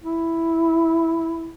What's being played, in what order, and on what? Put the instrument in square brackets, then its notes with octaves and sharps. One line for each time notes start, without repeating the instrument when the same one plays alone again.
[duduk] E4